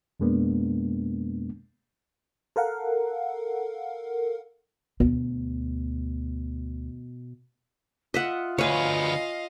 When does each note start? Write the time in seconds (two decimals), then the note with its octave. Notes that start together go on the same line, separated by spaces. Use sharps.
0.20 F2 B2 G#3 A#3 B3 D4
2.56 A4 A#4 F5 F#5
5.00 D2 B2
8.14 F4 D#5 E5 F#5
8.58 D2 B3 C#5 D#5 F5 G#5